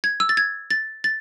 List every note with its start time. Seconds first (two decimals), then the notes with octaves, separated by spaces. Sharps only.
0.04 G#6
0.20 E6
0.29 A6
0.37 G#6
0.70 A6
1.04 A6